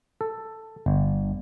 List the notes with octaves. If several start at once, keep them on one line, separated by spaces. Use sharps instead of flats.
A4
G1